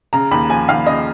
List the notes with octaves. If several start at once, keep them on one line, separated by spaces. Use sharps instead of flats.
C#3 A#5
D#2 B5
F3 G#5
D#2 F5
C#3 D#5